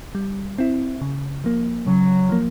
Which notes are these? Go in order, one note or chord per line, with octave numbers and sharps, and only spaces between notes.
G3
C4 E4
C#3
F3 A#3
C#3 F#3
F3 A#3